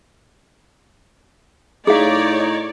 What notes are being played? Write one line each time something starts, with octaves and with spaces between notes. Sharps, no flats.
A2 D#4 G#4 C#5 D5 F5